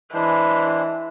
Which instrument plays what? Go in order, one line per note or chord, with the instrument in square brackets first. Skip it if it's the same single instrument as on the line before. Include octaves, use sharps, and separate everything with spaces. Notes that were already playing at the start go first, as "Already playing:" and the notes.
[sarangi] E3 [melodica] G#3 D4 C5